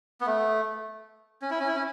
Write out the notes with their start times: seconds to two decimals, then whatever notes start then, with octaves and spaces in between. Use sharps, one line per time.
0.21 B3
0.26 A3
1.42 C#4
1.50 E4
1.60 C#4
1.68 E4
1.76 C#4